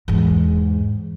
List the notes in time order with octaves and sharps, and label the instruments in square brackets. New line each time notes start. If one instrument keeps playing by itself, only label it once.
[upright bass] E2 G#2